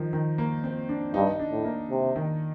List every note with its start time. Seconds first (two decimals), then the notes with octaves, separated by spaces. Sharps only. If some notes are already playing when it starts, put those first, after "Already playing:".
Already playing: D#3 F3
0.13 D#3
0.38 A#3
0.64 C4
0.89 D4
1.14 G2 D#4
1.39 D4
1.52 A2
1.65 A#3
1.90 C3
2.16 D#3